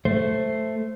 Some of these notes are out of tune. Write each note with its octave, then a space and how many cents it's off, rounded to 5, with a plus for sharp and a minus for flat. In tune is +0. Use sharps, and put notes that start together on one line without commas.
A3 +0 C5 +0